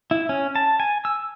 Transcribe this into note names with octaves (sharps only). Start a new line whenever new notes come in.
E4
C#4
A5
G#5
E6